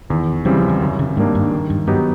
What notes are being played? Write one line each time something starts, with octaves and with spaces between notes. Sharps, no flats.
E2 D#3
C#3 E3 F#3 G3 C4
F3
E3
F#2 D#3
C#3
G#2 D#3 G3 A#3 D4
G2
D#3
G2
G2 F#3 B3 D#4 G4